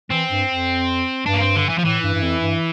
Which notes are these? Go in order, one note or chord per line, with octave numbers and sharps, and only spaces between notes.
E3 C4
G2
F2
G2 D4
A#3
C4
D3
E3
F3
A2 E3
G2
G2
F2
G2